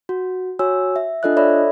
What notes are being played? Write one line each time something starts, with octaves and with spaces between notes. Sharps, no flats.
F#4
F#4 C#5 G#5 E6
E5
D4 F4 A4 D#5 E5 F#6
A4 C#5 D5 E5 B5